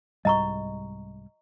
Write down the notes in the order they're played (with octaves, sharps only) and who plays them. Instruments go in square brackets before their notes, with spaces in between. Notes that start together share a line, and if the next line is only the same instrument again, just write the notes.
[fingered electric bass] C2 G#2 G3 [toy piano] D#5 A#5 C#6